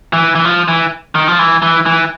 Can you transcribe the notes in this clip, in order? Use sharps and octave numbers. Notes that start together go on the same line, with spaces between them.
E3
E3
F3
E3
D#3
F3
E3
E3
E3